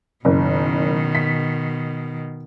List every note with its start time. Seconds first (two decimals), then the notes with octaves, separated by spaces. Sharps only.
0.25 F#1 B2 D#3
1.15 B6